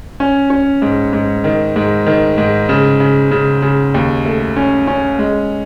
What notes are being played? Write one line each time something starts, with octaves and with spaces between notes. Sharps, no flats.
C#4
C#4
G#2
G#2
D#3
G#2
D#3
G#2
C#3
C#3
C#3
C#3
D#2
A3
C#4
C#4
G#3